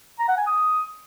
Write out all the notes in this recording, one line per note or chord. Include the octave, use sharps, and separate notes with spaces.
A#5
F#5
G#5
D#6